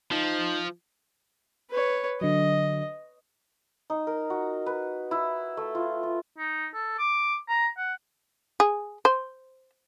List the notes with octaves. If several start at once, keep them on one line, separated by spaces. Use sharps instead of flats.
F3 D#4
B4 C#5
D3 F#3 D#5
D#4
A#4
F#4
B4
E4
A3
F4
F4
D#4
A4
D6
A#5
F#5
G#4
C5